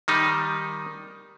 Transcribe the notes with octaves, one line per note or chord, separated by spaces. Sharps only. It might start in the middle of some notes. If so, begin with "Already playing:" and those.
D#3 G3 D#4